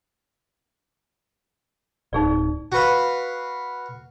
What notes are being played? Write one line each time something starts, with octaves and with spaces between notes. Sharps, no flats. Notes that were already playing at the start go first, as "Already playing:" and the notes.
D1 D#4 G#4 D5
F#4 B4 F5